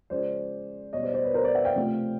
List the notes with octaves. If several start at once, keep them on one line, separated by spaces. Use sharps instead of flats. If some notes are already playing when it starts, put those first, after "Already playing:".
C#3 F3 G#3 C5 D5
B2 G3 C#5 D#5
C5 D5
C5 D5
B4 C#5
A#4 C5
C5 D5
E5 F#5
F5 G5
C3 F3 A3